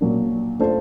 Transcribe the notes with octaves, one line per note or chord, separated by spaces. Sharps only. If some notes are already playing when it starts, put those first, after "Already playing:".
A#2 F#3 A#3 D4
A3 D4 F4 A4 C5